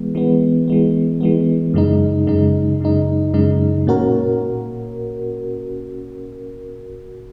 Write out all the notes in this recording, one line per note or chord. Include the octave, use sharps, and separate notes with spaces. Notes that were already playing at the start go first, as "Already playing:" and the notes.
Already playing: E3 G#3 B3
E3 G#3 B3
E3 G#3 B3
E3 G#3 B3
F#2 C#3 G#3 D#4
F#2 C#3 G#3 D#4
F#2 C#3 G#3 D#4
F#2 C#3 G#3 D#4
A#2 A#3 C#4 F#4 A#4